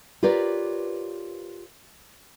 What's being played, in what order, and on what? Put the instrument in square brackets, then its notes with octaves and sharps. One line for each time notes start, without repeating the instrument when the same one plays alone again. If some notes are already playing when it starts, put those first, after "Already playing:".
[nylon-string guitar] F4 G4 A#4 B4 C#5 D5